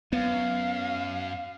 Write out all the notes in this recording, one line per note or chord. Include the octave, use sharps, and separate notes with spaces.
F#2 B3 F5